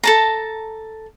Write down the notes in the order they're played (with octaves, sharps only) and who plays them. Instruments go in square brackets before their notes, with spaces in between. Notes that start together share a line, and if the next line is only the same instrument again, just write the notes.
[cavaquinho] A4 A5 A#5